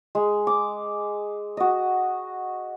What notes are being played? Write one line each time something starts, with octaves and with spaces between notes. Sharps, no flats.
G#3
D6
F#4 D#5